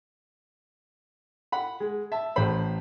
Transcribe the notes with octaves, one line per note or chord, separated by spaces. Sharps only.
F#5 B5
G#3
E5 A5
A1 A2 C5 B5